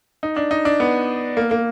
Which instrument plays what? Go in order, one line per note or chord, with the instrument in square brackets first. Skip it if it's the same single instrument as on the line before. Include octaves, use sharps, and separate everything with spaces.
[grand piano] D#4
D4
D#4
D4
B3
A#3
A#3